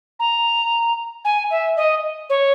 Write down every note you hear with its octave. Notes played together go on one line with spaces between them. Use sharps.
A#5
G#5
E5
D#5
C#5